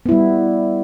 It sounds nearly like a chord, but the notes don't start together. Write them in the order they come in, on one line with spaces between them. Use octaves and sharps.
B3 E4 G3